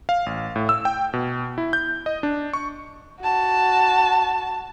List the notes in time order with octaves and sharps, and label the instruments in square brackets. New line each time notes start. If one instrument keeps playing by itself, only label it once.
[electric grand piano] F5
A1
A2
E6
G5
B2
E4
G6
D#5
D4
C#6
[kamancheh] F#4 A5